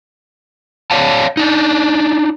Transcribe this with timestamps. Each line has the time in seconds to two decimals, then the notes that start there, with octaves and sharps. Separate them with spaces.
0.91 C#5 D5 F5 A5
1.37 D4 D#4